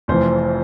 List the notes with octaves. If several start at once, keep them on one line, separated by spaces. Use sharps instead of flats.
F1 F2 E3 C5